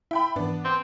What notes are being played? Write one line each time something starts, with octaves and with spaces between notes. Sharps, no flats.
E4 E5 G5 B5
G#2 E3 B3 D4
C4